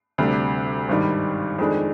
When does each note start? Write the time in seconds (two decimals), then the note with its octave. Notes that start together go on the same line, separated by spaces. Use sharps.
0.18 D2 C3 G3 D4
0.89 G#1 G2 D#3 G3
1.58 F2 D#3 G#3 D4